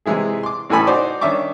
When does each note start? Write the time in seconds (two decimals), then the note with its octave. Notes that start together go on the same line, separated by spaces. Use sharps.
0.06 C3 E3 G#3 E4 G#4
0.43 C6 D6
0.70 A1 A2 E3 A4 G#5 B5
0.87 D#4 F#4 C5 D5 G#5
1.21 D#3 C#4 D4 E5 C#6 D6